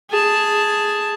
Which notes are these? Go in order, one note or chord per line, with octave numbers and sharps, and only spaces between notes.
G#4 A5